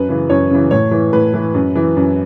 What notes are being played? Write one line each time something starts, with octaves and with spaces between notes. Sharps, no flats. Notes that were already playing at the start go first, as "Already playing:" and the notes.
Already playing: F#2 B4
C#3 E3
F#2 C#5
C#3 E3
A2 C#5
E3
A2 B4
E3
F#2
E3
F#2